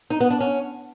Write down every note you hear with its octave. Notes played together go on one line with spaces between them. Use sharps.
D#4
B3
D4
C#4